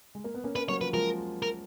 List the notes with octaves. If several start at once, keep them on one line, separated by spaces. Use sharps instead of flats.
G#3
A#3
B3
A#3 C#4
A#3 C#4 B4
F#3 A#3 C#5
F3 B4
F3 G#3 A#4
A#4